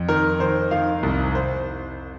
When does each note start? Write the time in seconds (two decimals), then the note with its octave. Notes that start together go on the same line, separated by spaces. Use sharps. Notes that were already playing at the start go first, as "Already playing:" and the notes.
Already playing: F2
0.09 D#3 A#4
0.40 D#3 C5
0.71 D#3 F5
1.03 C2
1.35 C5